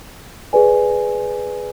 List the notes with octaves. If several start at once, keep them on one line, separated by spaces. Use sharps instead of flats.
G#4 B4 D5 G#5